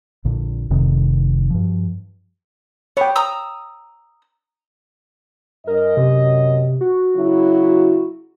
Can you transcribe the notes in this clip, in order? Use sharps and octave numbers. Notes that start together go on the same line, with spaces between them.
A#1 A#2 D3
F1 F2 C3 D#3
G2 F3
B3 C#5 F#5 G5
A#5 D#6 E6
F#2 A#4 D#5
C3
F#4
C#3 F#3 E4